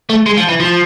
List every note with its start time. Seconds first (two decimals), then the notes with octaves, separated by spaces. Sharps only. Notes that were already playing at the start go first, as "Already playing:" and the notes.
0.10 A3
0.26 G#3
0.37 F3
0.49 E3
0.60 F3